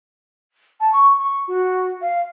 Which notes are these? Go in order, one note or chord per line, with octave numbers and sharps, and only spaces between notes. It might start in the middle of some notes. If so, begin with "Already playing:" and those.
A5
C#6
C#6
F#4
F5